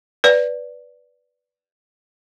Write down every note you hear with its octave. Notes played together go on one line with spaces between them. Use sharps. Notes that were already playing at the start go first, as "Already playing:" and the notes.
B4 D5